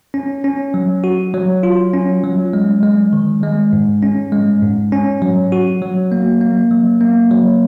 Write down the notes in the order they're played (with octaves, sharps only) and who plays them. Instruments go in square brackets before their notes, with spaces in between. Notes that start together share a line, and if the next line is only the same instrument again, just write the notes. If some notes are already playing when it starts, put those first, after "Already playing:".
[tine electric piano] C#4
C#4
F#3
F#4
F#3
F4
C#4
F#3
G#3
G#3
D#3
G#3
G#2
C#4
G#3
G#2
C#4
F#3
F#4
F#3
A#3
A#3
F#3
A#3
F#3